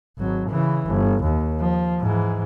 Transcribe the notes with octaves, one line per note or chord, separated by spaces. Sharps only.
G#1 F#3
C#3 E3
G1
D#2
F3
G#2 E3